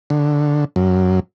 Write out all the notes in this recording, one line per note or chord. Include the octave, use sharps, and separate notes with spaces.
D3
F#2